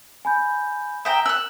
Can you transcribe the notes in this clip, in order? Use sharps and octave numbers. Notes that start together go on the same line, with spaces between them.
G#5 B5 G6
E5 G5 A#5 D#6 E7 G7
E6 F#6 F#7